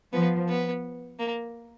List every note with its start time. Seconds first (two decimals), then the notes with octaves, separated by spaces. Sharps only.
0.12 F3 B3
0.48 B3
1.19 A#3